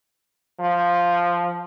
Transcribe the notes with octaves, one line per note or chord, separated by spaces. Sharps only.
F3